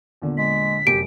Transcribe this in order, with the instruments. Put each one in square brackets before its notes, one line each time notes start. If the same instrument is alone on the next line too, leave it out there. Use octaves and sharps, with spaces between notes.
[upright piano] E2 A#2 D3
[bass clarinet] G#3 [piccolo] B6
[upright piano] F1 F#2 [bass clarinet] G4 [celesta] D7